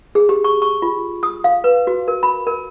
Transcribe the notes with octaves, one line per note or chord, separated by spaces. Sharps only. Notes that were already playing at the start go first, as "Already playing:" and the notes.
G#4
G4
C#6
C#6
F4
D#6
F5
B4
F#4
A#4
B5
A#4